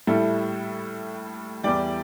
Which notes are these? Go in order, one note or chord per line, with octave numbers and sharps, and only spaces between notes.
A2 G3 E4 A4
E2 E3 G3 D5 G5